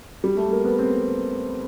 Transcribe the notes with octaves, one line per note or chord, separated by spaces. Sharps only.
G3
A3
A#3
B3
C4